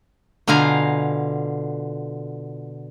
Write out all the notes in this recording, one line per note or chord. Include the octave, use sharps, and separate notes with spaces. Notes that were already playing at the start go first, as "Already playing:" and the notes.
B2 D3 F4 F5 G#5 A#5